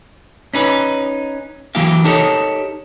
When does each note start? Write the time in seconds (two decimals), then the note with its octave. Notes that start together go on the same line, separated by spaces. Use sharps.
0.54 C#4 D#4 B4
1.75 E3 F#3 A#3 E4 G4 F5
2.04 D#4 G4 A4 A#4 C#5 D#5